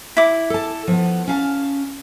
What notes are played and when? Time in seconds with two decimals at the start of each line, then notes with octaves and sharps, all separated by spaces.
0.17 E4 D6
0.50 A4 A5
0.88 F3 B3
1.27 C#4 F5 A5